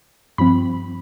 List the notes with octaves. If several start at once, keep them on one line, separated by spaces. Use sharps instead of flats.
G2 F3 C4 B5